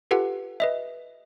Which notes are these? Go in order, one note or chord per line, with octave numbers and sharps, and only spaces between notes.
F4 G4 A4 B4 F#5
B4 D#5 E5